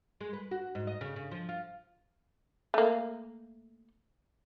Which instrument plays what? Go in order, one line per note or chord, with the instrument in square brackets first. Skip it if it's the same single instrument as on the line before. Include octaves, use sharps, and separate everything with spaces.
[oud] G#3
B4
F#4
G#2
D#5
C#3
C#3
F3
F4
[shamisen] A3 A#3